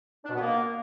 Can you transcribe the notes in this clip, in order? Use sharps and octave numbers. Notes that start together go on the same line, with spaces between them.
D4
B2
B3
A#3